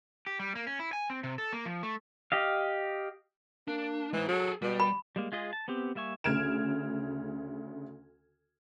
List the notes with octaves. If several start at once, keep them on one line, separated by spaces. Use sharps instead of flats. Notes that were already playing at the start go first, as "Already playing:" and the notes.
G4
G3
A#3
C#4
E4
G#5
C4
C3
A4
A#3
F3
A3
G4 D#5 F5
A#3 D4
E3 G#3 C5
F#3 G#4 A4
B2 G3
B5
G3 G#3 A#3
G#3 F4 G#4 D#5
A5
B3 C4 G4
G3 A#3 E5 G#5 C#6
D2 C#3 F6 G#6 D7 E7